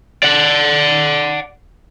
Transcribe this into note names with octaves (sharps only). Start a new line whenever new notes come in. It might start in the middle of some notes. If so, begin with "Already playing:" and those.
D5 F#5